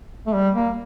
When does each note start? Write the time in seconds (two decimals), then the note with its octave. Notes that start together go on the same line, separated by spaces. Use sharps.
0.27 A3
0.34 G3
0.55 A#3